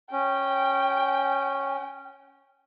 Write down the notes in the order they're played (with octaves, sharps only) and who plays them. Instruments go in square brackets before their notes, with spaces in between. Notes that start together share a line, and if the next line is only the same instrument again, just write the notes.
[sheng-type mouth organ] C#4 [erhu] G5